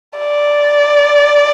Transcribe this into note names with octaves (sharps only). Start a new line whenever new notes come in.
D5